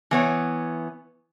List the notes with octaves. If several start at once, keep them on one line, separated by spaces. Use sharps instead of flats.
E3 B3 C#5